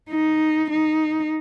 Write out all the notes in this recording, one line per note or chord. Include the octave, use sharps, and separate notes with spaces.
D#4
D#4